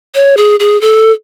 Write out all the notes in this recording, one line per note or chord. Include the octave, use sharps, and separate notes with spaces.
C#5
G#4
G#4
A4